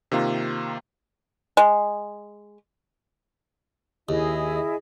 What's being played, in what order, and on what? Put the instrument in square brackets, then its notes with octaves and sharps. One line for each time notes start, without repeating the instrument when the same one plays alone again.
[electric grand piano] C3 D#3 A#3 F4
[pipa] G#3
[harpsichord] D#2 [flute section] E4 G#4 D#5